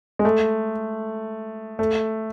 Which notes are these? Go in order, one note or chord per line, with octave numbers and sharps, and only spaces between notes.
G#3
A3
A3